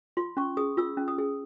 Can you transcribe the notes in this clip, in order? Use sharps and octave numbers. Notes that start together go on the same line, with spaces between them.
F4 C6
C#4 C#6
G#4 D#6
F4 E6
C#4
D#6
G#4